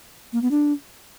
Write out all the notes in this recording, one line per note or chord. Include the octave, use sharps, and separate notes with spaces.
A#3
B3
D4